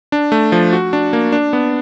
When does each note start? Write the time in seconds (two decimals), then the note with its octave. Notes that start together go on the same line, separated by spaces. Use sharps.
0.12 D4
0.32 A3
0.52 F3
0.73 F#4
0.93 D4
1.13 A#3
1.32 D4
1.53 B3